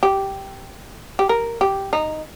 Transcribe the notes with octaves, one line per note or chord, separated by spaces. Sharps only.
G4
G4
A#4
G4
D#4